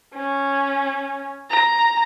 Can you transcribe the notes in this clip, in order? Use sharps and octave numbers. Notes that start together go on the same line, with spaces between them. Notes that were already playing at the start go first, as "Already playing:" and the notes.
C#4
A#5